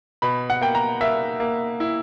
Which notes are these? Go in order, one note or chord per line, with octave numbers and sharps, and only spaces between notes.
B2 B5
F#5
A#3 G5
A#5
A#3 E5
A#3
E4